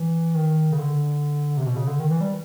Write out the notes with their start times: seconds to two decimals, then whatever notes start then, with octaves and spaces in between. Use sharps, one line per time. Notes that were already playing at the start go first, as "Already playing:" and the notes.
Already playing: E3
0.34 D#3
0.72 C#3
0.78 D3
1.57 C3
1.66 B2
1.76 C#3
1.87 D3
1.99 D#3
2.10 E3
2.21 G3